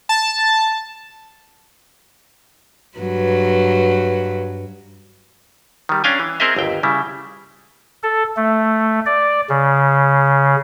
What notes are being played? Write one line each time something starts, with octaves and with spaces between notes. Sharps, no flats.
A5
G2 F#3 B4
D#3 G3
C#4 D4 F5 G5 G#5
E3
C4 G#4 A#4 C5 D#5 E5
G1 D#2 G5
C#3 G3 E4
A4
A3
D5
C#3